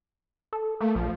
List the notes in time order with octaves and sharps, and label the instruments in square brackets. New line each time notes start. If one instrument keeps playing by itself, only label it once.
[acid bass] A4
[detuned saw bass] A3 [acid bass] A#3
[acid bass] A#1 [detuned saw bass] F3